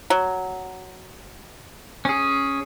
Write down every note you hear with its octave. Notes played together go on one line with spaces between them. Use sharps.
F#3
C#4 G#4